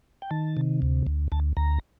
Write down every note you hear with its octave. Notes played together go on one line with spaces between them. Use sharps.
G5
D#3 A5
C3
D2
D2
D2 A5
D2 A#5